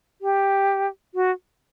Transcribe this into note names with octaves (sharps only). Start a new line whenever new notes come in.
G4
F#4